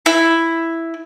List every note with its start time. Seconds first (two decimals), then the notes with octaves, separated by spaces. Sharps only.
0.06 E4